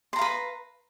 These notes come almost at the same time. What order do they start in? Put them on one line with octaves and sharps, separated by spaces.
C6 A#5 F5 B4